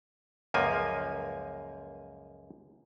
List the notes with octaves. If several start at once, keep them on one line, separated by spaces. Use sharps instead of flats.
C#2 F#2 F3 A#3 G#5